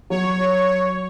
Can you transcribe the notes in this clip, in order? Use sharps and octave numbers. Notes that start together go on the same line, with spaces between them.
F#3 C#5